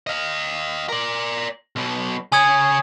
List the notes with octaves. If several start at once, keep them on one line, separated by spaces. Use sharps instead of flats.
D#5 F5
A#4 D5
B1 B2
C#3 C#5 G#5 D#6 G#6